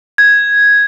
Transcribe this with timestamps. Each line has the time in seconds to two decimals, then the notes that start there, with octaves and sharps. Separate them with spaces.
0.18 G#6